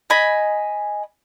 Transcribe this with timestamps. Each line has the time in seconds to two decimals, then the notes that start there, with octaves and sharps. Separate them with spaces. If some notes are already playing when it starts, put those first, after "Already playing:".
0.10 D#5 G#5 B5